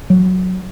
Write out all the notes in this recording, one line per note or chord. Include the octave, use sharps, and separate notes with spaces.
F#3